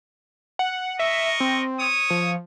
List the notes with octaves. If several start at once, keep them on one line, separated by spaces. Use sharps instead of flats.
F#5
A#4 D#5 E5 C#6
C4
C#5 D#6
F3